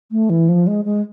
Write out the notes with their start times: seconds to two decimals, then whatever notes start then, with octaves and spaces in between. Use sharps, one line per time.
0.11 A3
0.30 E3
0.48 F3
0.67 G#3
0.85 G#3